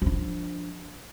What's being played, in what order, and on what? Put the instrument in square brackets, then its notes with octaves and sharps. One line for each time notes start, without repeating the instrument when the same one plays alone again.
[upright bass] F3 D4